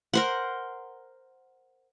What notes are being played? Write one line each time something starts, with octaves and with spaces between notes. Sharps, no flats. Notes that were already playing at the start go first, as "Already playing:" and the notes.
A#4 C5 F#5